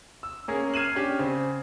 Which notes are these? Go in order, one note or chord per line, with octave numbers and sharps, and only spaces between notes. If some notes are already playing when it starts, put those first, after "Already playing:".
E6
A#3 C#4 G#4 A#4
F6 G#6 C7 D#7 E7 F#7
C#4 D4 G4
C#3 C4